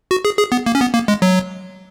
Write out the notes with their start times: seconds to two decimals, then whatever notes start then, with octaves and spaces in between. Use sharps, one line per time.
0.11 F#4
0.25 G#4
0.38 G#4
0.52 B3
0.66 A#3
0.75 C#4
0.81 B3
0.94 A#3
1.08 G#3
1.22 F#3